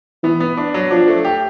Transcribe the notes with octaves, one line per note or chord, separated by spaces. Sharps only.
E3 B3
B3
D4
F#3
F3 D4
A3
G4